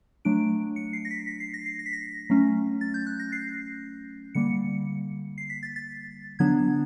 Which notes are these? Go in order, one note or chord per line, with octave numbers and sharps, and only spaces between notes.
F#3 A3 D4 D7
C#7
C7
A#6
B6
B6
C7
A#6
C7
A#6
B6
A#6
F#3 A3 C#4
A6
G6
F#6
A#6
C7
D3 G3 A#3 C#7
C7
B6
A6
A6
D3 F#3 B3 D4 G#6